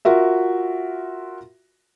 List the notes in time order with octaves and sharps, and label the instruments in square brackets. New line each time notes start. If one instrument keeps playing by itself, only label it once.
[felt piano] F4 F#4 A#4 E5